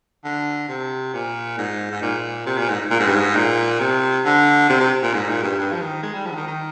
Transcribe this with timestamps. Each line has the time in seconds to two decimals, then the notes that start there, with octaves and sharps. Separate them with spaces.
0.25 D3
0.69 C3
1.14 A#2
1.58 G#2
1.91 G#2
2.03 A#2
2.46 C3
2.58 A#2
2.70 G#2
2.91 A#2
3.00 G#2
3.07 G2
3.15 G#2
3.36 A#2
3.80 C3
4.26 D3
4.70 C3
4.81 C3
5.03 A#2
5.14 G#2
5.29 A#2
5.43 G2
5.59 G2
5.72 F3
5.81 D#3
6.03 G#3
6.14 G3
6.26 F3
6.31 D3
6.36 D#3
6.48 D#3